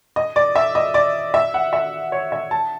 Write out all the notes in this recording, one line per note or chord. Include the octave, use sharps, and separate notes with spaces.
D#5
D5
E5
D#5
D5
E5
F#5
E5
C#5
E5
A5